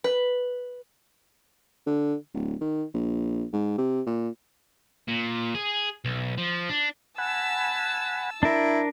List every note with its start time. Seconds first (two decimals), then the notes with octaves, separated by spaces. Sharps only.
0.04 B4
1.86 D3
2.34 D1
2.61 D#3
2.94 A#1
3.53 G#2
3.78 C3
4.06 A#2
5.08 A#2
5.55 G#4
6.05 B1
6.38 F3
6.69 D4
7.18 F#5 G#5 A5 B5 E6
8.43 D4 E4 A#4